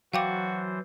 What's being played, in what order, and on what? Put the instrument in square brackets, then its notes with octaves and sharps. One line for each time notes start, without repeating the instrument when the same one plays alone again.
[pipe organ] E3 C5 [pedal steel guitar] F#3 A5 [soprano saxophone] F#4 [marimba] F5 G5 D6